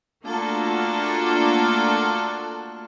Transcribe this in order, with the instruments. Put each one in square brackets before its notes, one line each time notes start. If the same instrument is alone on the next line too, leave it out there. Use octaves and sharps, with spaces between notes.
[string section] A3 A#3 D4 F4 F#4 A4